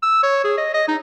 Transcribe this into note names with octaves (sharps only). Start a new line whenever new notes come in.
E6
C#5
G#4
D#5
D#5
D#4